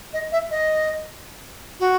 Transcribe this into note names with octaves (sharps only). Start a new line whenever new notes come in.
D#5
E5
D#5
F#4